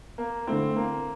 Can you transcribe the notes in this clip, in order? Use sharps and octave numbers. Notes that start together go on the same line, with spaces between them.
A#3
D3 A3 C4 E4
A#3